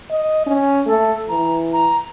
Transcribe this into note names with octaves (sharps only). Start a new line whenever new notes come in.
D#5
C#4
A3 A4
E3 A#5
A#5